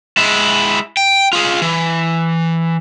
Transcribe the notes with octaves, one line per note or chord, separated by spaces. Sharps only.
G#3 E4
G5
F4 G#4
E3